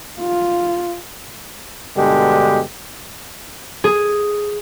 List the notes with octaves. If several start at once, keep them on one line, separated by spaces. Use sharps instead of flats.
F4
G2 B2 D3 G#3 G4
G#4